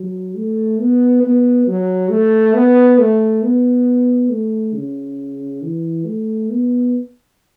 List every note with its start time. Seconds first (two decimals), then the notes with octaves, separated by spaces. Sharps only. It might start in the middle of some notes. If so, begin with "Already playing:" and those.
Already playing: F#3
0.36 A3
0.80 B3
1.24 B3
1.67 F#3
2.10 A3
2.54 B3
2.99 A3
3.42 B3
4.30 A3
4.75 C#3
5.62 E3
6.06 A3
6.50 B3